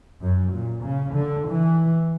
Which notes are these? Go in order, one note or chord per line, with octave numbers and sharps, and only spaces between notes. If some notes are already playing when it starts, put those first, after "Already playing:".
F#2
A#2
C#3
D3
E3